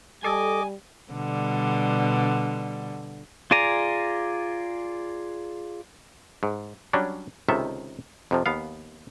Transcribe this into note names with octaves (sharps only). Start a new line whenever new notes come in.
G3 A4 D#5 G#5 D6
B2 D3 G3
F4 G#4 D5 G#5 A#5
G#2
F#3 G3 C#4 D4
C#2 C3 D#3 A4 E5
F2 C3 F3
D#2 B3 F5